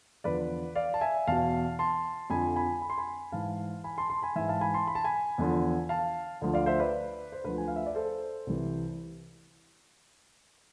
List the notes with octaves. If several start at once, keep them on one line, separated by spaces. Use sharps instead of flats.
E2 D3 F3 B4 D5
D5 F5
A5
E5 G#5
E2 B2 F5 A5
A5 C6
F2 D3 F3 G#5 B5
G#5 B5
B5
C6
G#5 B5
G#2 E3 F5 A5
G#5 B5
A5 C6
A5 C6
G#5 B5
G#2 E3 E5 G#5
F5 A5
G#5 B5
A5 C6
B5
A5
G#5 B5
E2 D3 F3
F5 A5
D2 D3 F3
D5 F5
C5 E5
B4 D5
C5
D2 D3 F3 B4
G#5
F5
E5
D5
A4 C5
C2 C3 E3